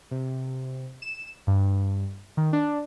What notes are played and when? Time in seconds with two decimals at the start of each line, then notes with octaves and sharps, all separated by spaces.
0.11 C3
1.02 E7
1.47 G2
2.37 D#3
2.53 D4